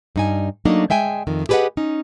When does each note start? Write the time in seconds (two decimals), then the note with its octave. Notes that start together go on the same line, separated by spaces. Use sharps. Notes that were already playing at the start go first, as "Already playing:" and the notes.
0.16 G2 D#4 G#5
0.65 F#3 A3 A#3 D4 D#4 D#5
0.90 G#3 E5 G5 G#5
1.27 F2 D#3
1.49 G4 G#4 B4 C#5 D#5 F#5
1.77 C#4 D#4